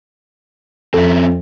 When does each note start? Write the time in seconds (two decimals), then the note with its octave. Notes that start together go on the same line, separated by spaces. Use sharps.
0.94 F2 C4 C#4 A4 E5